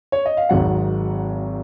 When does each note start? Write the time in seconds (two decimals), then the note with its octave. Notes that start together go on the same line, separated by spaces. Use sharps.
0.12 C#5
0.26 D#5
0.37 F5
0.49 G#1 G#2 D#3 F#3 F#5